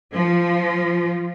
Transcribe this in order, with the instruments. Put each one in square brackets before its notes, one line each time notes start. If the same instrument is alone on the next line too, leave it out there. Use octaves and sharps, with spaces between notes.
[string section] F3